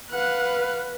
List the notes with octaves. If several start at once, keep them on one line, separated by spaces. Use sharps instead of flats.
B4 F5 F#5